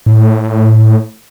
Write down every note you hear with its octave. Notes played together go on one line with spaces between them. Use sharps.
A2